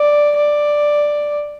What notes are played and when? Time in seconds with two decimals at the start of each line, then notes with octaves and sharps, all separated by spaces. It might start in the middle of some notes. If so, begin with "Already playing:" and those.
Already playing: D5
0.37 D5